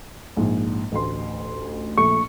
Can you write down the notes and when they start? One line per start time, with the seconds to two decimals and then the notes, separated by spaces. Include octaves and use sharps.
0.37 A#1 G#2
0.92 A1 D2 C6
1.98 A#1 A3 C#6 C#7